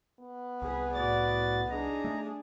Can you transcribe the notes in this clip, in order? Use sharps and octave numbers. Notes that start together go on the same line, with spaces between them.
B3
C2 G#4 B4
A2 F#4 D5 A6
D4 D#4 G#4 A#5
A3